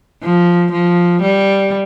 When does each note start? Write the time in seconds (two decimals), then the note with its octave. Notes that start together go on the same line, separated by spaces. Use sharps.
0.23 F3
0.72 F3
1.22 G3